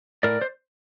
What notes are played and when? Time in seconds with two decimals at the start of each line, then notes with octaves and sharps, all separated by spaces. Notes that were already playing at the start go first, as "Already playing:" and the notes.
0.23 A2 A#4 D5
0.42 C5